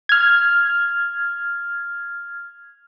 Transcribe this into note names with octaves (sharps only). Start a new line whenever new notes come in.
F6 G#6